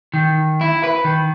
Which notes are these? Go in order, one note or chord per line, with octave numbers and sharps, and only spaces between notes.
D#3
E4
B4
D#3